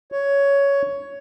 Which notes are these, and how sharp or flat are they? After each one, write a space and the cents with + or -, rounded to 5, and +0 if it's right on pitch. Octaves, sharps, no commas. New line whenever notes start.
C#5 +10